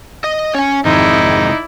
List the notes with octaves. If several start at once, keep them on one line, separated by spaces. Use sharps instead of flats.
D#5
C#4 C#5 G#5
G#1 F2 C3 D#3 G#3 D#4 E4 D5